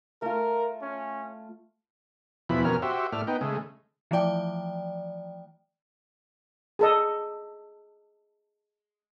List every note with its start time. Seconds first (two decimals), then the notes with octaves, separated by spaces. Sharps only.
0.22 A3 F4 A#4
0.82 C#4
2.49 E2 B2 F3 E4 B5
2.65 F2 B2 C#4 A#4 F6
2.82 F#4 G4 C5 E5
3.12 A2 A3 D5 F6
3.27 B3 D#4 G5
3.41 C#3 G#3 A3
4.11 E3 F3 A3 D5 G5
6.79 G#4 A4 D#5